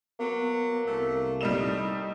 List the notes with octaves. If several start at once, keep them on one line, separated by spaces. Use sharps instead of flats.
F#3 A#3 B3
C2 A3
A2 G3 D#4 E7